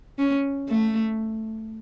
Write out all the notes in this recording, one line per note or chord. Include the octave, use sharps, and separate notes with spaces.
C#4
A3